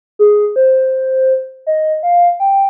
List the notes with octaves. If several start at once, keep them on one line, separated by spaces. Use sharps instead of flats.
G#4
C5
D#5
F5
G5